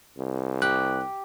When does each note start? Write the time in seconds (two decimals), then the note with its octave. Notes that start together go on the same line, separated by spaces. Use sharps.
0.18 C2
0.62 G4 F#6